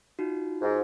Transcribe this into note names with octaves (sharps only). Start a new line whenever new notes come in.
D#4 F4 F#4
G#2